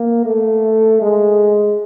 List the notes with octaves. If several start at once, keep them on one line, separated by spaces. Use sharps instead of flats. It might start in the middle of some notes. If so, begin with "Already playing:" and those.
Already playing: A#3
A3
G#3